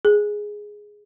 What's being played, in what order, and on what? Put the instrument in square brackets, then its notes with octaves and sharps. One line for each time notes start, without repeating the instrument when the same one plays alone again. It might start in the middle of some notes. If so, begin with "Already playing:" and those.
[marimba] G#4